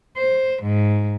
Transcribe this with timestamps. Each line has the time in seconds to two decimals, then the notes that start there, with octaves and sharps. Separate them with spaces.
0.18 C5
0.63 G#2